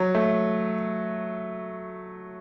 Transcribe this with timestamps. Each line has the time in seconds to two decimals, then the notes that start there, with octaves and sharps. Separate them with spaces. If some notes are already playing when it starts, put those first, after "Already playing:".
Already playing: F#3
0.15 A3